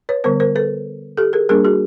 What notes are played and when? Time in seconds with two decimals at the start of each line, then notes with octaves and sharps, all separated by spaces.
0.09 B4 C#5
0.24 D3 G3 B3 A#4 C5
0.40 A#4 C5
0.55 A4 B4
1.17 G4 A4
1.33 G#4 A#4
1.49 G3 A#3 D4 G#4 A#4
1.65 F#4 G#4